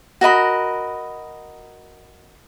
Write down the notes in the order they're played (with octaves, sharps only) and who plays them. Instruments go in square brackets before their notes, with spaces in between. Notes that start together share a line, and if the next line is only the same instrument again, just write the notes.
[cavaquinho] F#4 A#4 D#5 B5